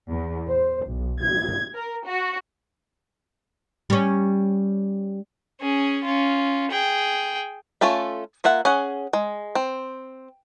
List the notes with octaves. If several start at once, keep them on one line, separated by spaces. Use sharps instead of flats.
E2
C5
B1
G#6
A#4
F#4
G3 C#4
C#4 G#4
C#4 F4
G#4 G5
A3 C#4 F4 A4 E5
A#3 F4 E5 F#5
C#4 G#4 F#5
G#3
C4